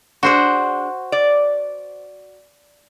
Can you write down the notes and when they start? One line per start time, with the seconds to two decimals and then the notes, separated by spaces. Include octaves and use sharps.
0.23 D4 F#4 G#4 C5 F#5
1.12 D5